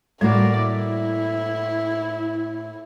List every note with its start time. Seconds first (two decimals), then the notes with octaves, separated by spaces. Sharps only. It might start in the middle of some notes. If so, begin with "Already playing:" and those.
0.21 A2 G3 A#3 F#4 A#4 D5
0.61 E4